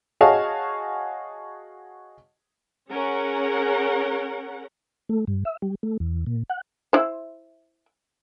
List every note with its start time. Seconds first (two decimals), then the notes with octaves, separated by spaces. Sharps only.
0.21 F#4 G#4 C#5 D#5 F5 A5
2.90 C#4 G#4 A#4 F#5
5.09 A3
5.27 G2
5.45 E5
5.62 G3
5.83 A3
6.00 E2
6.26 A#2
6.50 F#5
6.93 E4 C5